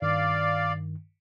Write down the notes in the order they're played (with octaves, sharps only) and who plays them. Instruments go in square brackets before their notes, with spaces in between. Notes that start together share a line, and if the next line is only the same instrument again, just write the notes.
[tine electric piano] G2 D#3 [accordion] D5 F5